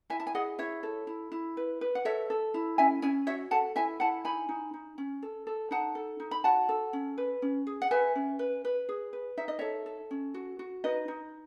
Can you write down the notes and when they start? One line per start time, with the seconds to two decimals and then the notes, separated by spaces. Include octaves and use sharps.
0.10 E4 E5 G#5
0.20 A5
0.27 G#5
0.35 G#4 D#5 F#5
0.59 E4 C#5 E5
0.83 A4
1.07 E4
1.32 E4
1.57 B4
1.81 B4
1.95 F#5
2.05 A4 C#5 E5
2.30 A4
2.54 E4
2.78 C#4 E5 G#5
3.02 C#4 E5 G#5
3.27 F#4 C#5 E5
3.51 A4 F#5 A5
3.76 E4 E5 G#5
4.00 E4 F#5 A5
4.25 D#4 G#5 B5
4.49 D#4
4.74 D#4
4.98 C#4
5.22 A4
5.47 A4
5.71 D#4 F#5 A5
5.95 A4
6.20 D#4
6.31 B5
6.44 F#4 F#5 A5
6.69 A4
6.93 C#4
7.18 B4
7.42 C#4
7.67 G#4
7.82 F#5
7.91 B4 E5 G#5
8.15 C#4
8.39 B4
8.65 B4
8.89 G#4
9.13 B4
9.37 D#4 E5
9.48 D#5
9.59 A4 C#5 E5
9.86 A4
10.11 C#4
10.34 F#4
10.59 F#4
10.84 D#4 B4 D#5
11.08 D#4